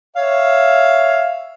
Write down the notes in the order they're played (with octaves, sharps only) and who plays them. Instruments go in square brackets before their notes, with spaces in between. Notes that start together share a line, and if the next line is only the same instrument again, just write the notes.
[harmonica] C#5 E5 F5